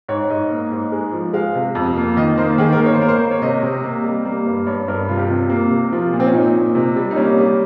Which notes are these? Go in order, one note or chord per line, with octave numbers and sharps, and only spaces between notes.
G#2 C#5
G#2 D#5
A#3
G#2
G#3
F3
G#3 F5
C3
F2
A#3
D#3 D#5
A#3 C5
D#3 G#4
A#4
A#3
C#5
C5
A#3 A#4
C5
A#3
C#5
C3 D#5
C3
A#3
G3
A#3
G2
G2 C#5
G2 A#4
C3 F4
G4
C3 F4
A#3
C3
F3 F4
A#2
C4
C#4
A#2 D#4
A#2
C3
G3
D#4
A#3 C#4
G3